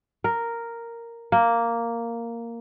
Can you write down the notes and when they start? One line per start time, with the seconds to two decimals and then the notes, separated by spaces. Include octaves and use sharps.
0.24 A#4
1.32 A#3